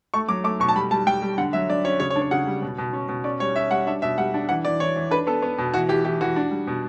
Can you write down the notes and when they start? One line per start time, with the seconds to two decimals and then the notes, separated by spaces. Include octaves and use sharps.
0.14 A3 C#6
0.29 F#3 D6
0.44 A3 D6
0.60 B2 C#6
0.69 A5
0.75 G3 B5
0.91 G3 A5
1.07 G3 G5
1.22 G3
1.38 D3 F#5
1.53 F#3 E5
1.69 D3 D5
1.85 C#4 C#5
2.00 C#3 C#5
2.10 C#5
2.16 D4
2.22 C#5
2.31 C#3 F#5
2.47 G3
2.62 B2
2.78 B2
2.93 C#4
3.09 B2
3.24 C#4 D5
3.40 G3 C#5
3.56 C#4 E5
3.71 G3 F#5
3.87 D4 E5
4.02 B2 E5
4.18 G3 F#5
4.34 D4
4.49 E3 F#5
4.65 E3 D5
4.80 E3 C#5
4.96 E3
5.11 D4 B4
5.27 B3 A4
5.42 B3
5.58 B2
5.74 E3 F#4
5.89 E3 G4
6.05 E3 G4
6.21 E3 F#4
6.36 D4
6.51 G3
6.67 B2